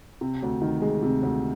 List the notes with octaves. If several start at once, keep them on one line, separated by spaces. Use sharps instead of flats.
C3
D2
D#3
G#3
C3
D2